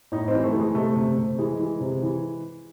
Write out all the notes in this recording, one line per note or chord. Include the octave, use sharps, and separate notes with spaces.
A2 D#4
C4
E3
A3
E3
G#3
C3 A3
C3
C3
E3 G#3
E3
C3
E3